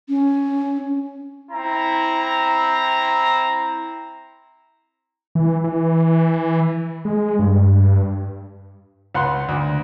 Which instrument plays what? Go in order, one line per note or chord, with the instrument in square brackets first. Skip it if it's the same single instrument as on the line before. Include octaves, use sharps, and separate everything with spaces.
[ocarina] C#4
[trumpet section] C4 E4 A#5
[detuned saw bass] E3
E3
G#3
G2
[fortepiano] C#2 F#5 C6
D2